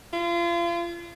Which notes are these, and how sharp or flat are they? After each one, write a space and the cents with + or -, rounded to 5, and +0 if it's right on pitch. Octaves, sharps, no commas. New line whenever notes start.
F4 -35